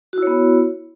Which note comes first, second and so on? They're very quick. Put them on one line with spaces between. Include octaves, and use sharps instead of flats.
F#4 E4 C#5 B3